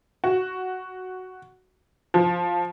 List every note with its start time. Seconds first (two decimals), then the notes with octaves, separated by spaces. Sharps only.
0.24 F#4
2.14 F3